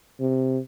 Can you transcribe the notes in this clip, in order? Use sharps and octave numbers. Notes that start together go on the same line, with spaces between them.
C3